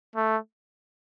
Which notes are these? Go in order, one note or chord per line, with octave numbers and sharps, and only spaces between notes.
A3